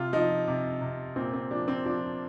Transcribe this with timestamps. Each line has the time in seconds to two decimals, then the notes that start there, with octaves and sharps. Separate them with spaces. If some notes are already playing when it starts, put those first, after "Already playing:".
Already playing: C3 F4
0.13 F3 D#4
0.47 C3
0.81 C3
1.16 A#2 C4
1.33 C4
1.51 F3 D4
1.68 C4
1.85 F3 D4